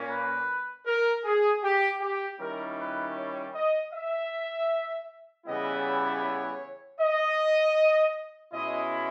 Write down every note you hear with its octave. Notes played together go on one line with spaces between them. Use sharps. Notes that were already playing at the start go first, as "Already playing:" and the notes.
Already playing: A#2 A#3 C#4
B4
A#4
G#4
G4
G4
D#3 G3 C#4 E4 A#4
B4
C#5
D#5
E5
C#3 E3 G3 B3 E4 D#5
C#5
D#5
B2 G#3 C#4 E4 D#5